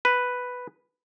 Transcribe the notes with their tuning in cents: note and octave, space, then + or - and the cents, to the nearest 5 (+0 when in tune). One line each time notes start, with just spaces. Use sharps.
B4 +0